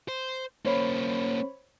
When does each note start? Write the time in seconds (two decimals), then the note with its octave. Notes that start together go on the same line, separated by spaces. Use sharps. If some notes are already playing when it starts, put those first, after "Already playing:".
0.08 C5
0.65 A#3 C#4 C5 C#5 B5